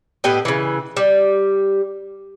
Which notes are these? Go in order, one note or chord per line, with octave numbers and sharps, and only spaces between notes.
A2 B3 G4 D#5
C#3 E3
G3